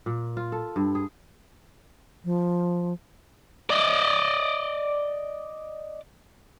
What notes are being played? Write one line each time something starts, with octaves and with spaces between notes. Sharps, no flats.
A#2
F4
A4
G2
G#4
F3
D5 D#5